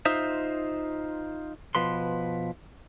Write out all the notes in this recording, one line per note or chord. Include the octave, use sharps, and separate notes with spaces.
D#4 F4 C5 E5
B2 F3 B4 C6